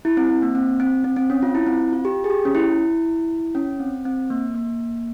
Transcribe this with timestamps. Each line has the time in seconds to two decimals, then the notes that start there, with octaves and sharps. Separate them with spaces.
0.05 E4
0.17 C4
0.29 C4
0.42 A#3
0.55 C4
0.80 C4
1.04 C4
1.16 C4
1.30 C#4
1.43 F4
1.55 E4
1.67 C4
1.92 F4
2.05 G4
2.24 G#4
2.30 G4
2.45 C#4
2.55 E4
3.55 C#4
3.80 C4
4.05 C4
4.30 A#3
4.55 A#3